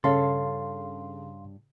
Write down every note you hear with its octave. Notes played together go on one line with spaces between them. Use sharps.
G2 C#3 A4 C#5 F5 C6